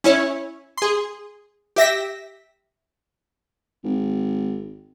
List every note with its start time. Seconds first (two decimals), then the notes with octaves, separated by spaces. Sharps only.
0.04 C#4 E4 C#5
0.78 G#4 C6
1.76 G4 E5 A#6 B6
3.84 G#1